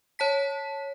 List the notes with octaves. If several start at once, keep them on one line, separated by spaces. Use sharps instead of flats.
C#5 A5 B6